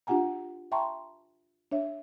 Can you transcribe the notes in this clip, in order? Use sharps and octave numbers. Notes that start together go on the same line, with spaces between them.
D4 F4 G4 F#5 G#5 A#5
E5 G5 A5 A#5 C6 C#6
D4 C#5 E5